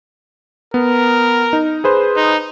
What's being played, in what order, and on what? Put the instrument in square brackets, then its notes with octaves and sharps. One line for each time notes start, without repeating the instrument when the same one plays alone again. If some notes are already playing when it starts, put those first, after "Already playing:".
[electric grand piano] B3 [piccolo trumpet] A#4
[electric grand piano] D#4
G#4 B4 C5
[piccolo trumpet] D#4